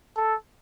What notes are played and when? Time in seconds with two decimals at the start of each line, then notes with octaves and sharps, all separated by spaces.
0.16 A4